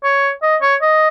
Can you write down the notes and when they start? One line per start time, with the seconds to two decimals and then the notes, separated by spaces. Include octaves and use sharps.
0.04 C#5
0.42 D#5
0.62 C#5
0.82 D#5